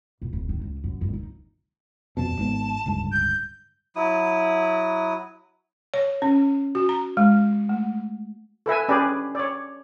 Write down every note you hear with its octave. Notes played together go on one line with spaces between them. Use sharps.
A#1
D1
D#3
C#2
F#2
G2
D#4
D#1 F2 B2 A5
G#1 G#2 B3
D1 C#2 G2
G6
F#3 E4 D#6
C#5
C#4
F#4
A#5
G#3
A3
A4 B4 E5 G#5
C#4 D4 G4 G#4 B4 D5
C#5 D5